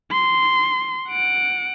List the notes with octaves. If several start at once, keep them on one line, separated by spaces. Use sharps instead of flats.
C6
F#5 D7